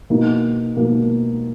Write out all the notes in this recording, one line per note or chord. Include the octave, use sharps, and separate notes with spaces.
B2 A#3 D#4
B2 A#3 D#4